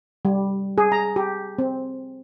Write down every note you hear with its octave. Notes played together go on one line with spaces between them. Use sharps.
G3
G#4
A#5
G4
C4